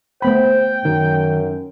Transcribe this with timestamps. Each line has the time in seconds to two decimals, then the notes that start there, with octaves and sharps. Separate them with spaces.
0.22 A3 B3 C5 G5 B5
0.85 F#2 D#3